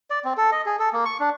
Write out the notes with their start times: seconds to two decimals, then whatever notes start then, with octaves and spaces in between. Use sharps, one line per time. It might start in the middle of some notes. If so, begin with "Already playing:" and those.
0.10 D5
0.25 C4
0.37 A4
0.52 D#5
0.66 G#4
0.79 A4
0.93 A#3
1.05 C#6
1.20 D4